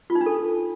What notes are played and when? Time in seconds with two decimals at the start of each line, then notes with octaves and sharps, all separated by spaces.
0.10 F4
0.15 D#4
0.21 D4
0.26 A4